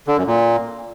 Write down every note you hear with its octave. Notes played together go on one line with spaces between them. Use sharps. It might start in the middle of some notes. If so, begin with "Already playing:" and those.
D3
F#2
A#2